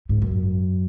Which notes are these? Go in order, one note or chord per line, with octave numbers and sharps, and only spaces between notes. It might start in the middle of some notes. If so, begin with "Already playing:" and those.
G#2
F#2